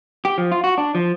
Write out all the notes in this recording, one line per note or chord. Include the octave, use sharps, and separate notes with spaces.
G4
F3
F4
F#4
D4
F3